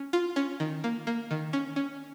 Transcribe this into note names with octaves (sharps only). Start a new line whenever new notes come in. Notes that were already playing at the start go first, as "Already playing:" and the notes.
Already playing: C#4
F4
C#4
D#3
A#3
A#3
D#3
C#4
C#4